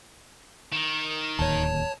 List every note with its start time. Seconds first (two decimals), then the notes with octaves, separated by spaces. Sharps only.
0.72 D#3
1.39 D1 D#2 C#5 A5